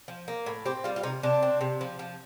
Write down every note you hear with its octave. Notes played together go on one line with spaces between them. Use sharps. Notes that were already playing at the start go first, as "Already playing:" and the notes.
F3
A#3
A2
C4 G4
G3 F4
F4
C3 D#4
C3 D4
C4
C3
F3
F3